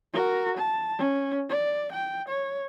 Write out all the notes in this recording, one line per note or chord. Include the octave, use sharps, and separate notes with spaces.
F#4 A#4
A5
C#4
D5
G5
C#5